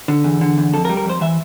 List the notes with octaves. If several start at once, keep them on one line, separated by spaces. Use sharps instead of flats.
D3
E2
D3
E2
F2 A4
A#4
G3
A#4
F2 C5
E3 E5